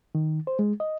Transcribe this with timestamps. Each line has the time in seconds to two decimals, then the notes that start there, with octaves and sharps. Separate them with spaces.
0.15 D#3
0.47 C5
0.59 G#3
0.80 D#5